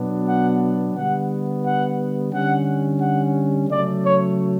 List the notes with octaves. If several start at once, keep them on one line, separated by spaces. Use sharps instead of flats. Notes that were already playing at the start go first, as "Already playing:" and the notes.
Already playing: B2 F#3 B3 D4
F#5
D3 G3 B3 F#5
F#5
D3 G3 C#4 F#5
F#5
C#3 F#3 A3 D5
C#5